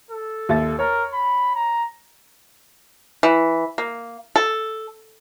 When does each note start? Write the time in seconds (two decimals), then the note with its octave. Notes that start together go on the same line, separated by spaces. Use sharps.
0.11 A4
0.49 D#2 E5 A6
0.79 A#4 C#5
1.14 B5
1.55 A#5
3.23 E3
3.78 A#3
4.36 A4